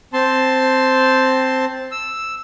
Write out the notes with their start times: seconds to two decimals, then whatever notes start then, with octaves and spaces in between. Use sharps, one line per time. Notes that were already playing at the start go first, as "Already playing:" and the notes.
0.13 C4 A5 C6
1.91 E6